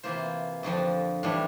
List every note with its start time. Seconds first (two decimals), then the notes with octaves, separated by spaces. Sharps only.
0.03 C3 E3 A#3 F4 C5
0.63 F2 D3 F3 C4
1.23 A2 E3 G3 D4